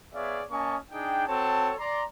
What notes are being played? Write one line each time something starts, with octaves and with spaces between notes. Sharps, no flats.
B3 G#4 C#5 D5 E5 F5
A#3 C#4 D#5 G#5 A5 C#6
D4 D#4 G#4 G5
C4 F#4 A4 C#5 A5
D5 A#5 C6